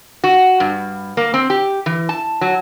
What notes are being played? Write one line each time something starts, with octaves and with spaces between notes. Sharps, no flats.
F#4
G2
A#3
C4
G4
E3
A5
F#3